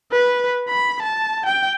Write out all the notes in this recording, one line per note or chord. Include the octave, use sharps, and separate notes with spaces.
B4
B5
A5
G5